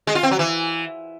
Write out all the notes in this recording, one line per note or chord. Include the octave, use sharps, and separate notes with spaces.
G#3
F4
C4
F#3
E3